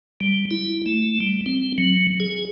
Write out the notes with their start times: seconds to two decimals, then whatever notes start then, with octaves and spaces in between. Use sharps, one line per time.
0.20 G3
0.51 E4
0.86 A3
1.20 G3
1.46 C4
1.78 F#3
2.20 G#4